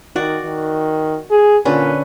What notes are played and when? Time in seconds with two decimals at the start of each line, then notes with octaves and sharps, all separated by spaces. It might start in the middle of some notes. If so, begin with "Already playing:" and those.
0.16 D#3 F#4 D5
0.45 D#3
1.31 G#4
1.65 A#2 D3 C#4 B4